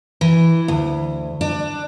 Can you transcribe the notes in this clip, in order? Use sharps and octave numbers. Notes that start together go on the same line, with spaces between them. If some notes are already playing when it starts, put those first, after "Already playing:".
E3
D2
D4